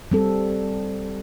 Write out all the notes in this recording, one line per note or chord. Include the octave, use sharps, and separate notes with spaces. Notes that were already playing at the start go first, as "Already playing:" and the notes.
G3 C4 A4